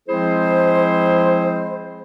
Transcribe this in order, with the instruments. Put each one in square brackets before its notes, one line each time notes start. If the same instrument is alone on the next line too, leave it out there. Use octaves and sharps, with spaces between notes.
[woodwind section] F3 G#3 C4 E4 G#4 C5